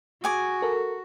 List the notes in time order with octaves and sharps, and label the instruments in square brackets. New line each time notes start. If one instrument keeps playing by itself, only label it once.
[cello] F#4 [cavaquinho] G#4 G#5 D6
[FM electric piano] A4 A#4